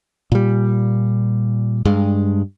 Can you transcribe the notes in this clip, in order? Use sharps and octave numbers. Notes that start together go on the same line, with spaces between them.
A#2 G3
G2 G#3